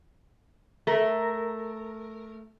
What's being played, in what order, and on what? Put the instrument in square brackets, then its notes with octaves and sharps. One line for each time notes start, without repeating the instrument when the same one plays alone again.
[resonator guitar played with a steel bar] A3 A#4